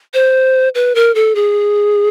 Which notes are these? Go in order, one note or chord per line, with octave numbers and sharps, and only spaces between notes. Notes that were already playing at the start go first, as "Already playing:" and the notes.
C5
B4
A#4
A4
G#4